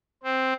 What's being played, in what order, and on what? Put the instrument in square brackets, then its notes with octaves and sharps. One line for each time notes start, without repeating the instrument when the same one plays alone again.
[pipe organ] C4